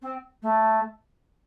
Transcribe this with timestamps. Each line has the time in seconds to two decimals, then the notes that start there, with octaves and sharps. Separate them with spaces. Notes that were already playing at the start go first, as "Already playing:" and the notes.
0.02 C4
0.42 A3